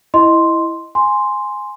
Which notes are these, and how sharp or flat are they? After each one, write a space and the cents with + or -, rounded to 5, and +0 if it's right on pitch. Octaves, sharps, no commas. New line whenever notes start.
E4 +0 D#5 +0 C6 +0
G#5 +0 C6 +0